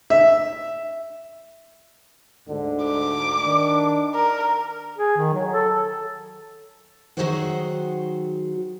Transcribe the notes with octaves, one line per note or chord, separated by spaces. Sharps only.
E5
D2 G#2 D3
D6
D#3 D4
A#4
G#4
D#3
F#3
A4
D#3 F#3 F#4 G#4 C5 F#5